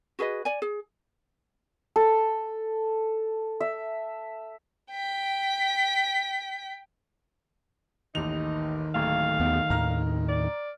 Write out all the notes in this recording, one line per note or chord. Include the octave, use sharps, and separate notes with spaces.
F#4 G#4 B4 D#5
D5 G#5
G#4
A4
E5
G5 B6
A1 D#2 D#3 D#4 F7
D1 A3 A#3 F5
D#2 B3
D#2 A2 A#5 F6
D5